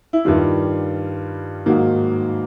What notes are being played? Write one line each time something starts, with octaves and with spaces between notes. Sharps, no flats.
E4
G2 D#3 G3 F4
G#2 D#3 F#3 A#3